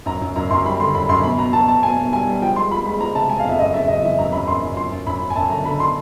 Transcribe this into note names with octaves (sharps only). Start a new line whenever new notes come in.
F#2 A#5
F#2
F#2 A#5
F#2 C6
G3 B5
D3 C6
F#2 B5
F#2 C6
B2 B5
B2 A#5
B2 A5
B2 A5
B2 G#5
B2
G3 G#5
G3
F3 G5
G#3 C6
F3 B5
G#3 B5
F3 A#5
C3 A5
G#3 G#5
F5
F2 E5
F#2 D#5
C#3 E5
F#2 D#5
E3 E5
F#2 A#5
F#2 B5
F#2 C6
F#2
F3 C6
F#2
F#2 B5
F#2
G#5
F#2 A5
D3 A#5
D3 B5
C6